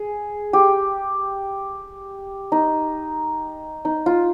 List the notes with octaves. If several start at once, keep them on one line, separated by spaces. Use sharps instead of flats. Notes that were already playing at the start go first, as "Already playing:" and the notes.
Already playing: G#4
G4
D#4
D#4
F4